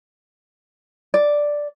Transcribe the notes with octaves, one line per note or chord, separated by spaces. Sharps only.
D5